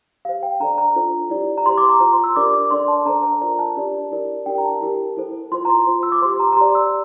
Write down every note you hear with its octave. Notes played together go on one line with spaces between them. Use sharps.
G4 C5 F5
G5
D4 A4 D5 A#5
A#5
D4 F4 A4 C5
E4 G4 D5
A#5
G4 C5 C6
D6
A#5
F4 C5 A#5
C6
E6
D4 G4 A#4 D5 D6
D6
D4 A4 D5 C6
A5
D4 A4 C5 A#5
A#5
F4 A#4 D5 A#5
A5
D4 G4 D5
E4 G4 A#4 D5
D4 G4 A#4 D5 G5
A#5
A5
E4 G4 A#4
E4 A4 C5
F4 C5 C6
A#5
C6
F4 C5
E6
D6
G4 C5 C6
A#5
A#5
G4 D5 C6
E6